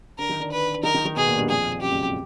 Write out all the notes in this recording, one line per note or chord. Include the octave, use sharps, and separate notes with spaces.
D3 D4 A#4
D#3 D#4
D3 D4
B4
D#3 D#4 A#4
D#3 D#4
D#3 D#4
B2 B3 G#4
A#2 A#3
G2 G3
F2 F3 G#4
F#2 F#3 G4
C#2 C#3
C3